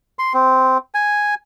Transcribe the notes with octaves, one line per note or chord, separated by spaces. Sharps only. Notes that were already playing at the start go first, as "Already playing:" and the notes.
C6
C4
G#5